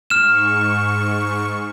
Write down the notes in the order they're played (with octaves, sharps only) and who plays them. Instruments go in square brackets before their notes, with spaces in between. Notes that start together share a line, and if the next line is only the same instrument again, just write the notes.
[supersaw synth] G#2 C#6 [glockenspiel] F6 E7